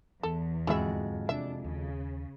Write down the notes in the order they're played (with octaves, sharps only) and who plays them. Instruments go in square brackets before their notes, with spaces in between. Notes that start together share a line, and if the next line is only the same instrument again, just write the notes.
[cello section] E2 [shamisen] A4
[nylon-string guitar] F2 G#3 F#4 [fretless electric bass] G#2 D3 F#3 [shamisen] E4 E5
[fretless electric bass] C3 [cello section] D4 [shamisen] E5
[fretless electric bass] D#2 [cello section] C#3